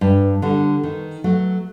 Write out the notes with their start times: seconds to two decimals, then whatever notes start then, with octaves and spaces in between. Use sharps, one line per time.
0.01 G2
0.42 D3 G3
0.83 D#3
1.24 F#3 A3